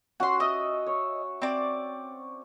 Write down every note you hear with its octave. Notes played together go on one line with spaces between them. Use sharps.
C#4 F#4 F#5 C6
D#5 E5
C#5
C4 D5